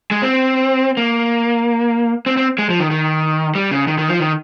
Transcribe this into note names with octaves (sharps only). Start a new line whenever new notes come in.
G#3
C4
A#3
C4
C4
G#3
F3
D#3
D#3
G3
C#3
D#3
D#3
F3
D#3